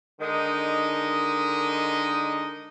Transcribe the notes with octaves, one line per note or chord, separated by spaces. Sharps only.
D3 D#3 G#3 D#4